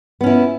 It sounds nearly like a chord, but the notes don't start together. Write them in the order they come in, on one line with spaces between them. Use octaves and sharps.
B3 C#4 E4